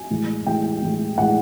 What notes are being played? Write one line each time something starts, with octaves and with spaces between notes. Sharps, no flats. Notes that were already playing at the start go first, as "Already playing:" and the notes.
Already playing: G#5
A2 E3 G#3
A2 E3 G#3 G5
A2 E3 G#3
A2 E3 G#3 F#5